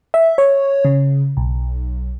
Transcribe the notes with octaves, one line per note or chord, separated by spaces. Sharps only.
E5
C#5
C#3
B1